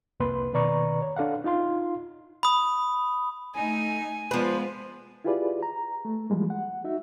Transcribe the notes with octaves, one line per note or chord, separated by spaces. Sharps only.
C2 F2 A#3 B4 C6
B2 D#3 B4 D5 A#5 C#6
C#5
D4 A4 F5 F#5
D#4 F4 F5 C6
B5 D#6
A3 D#4 G#5
F3 G#3 B3 F4 B4
E4 F4 G4 G#4 B4 D5
A#5
A3
E3 F3 G3 G#3 A#3
F#5
D#4 F#4 E5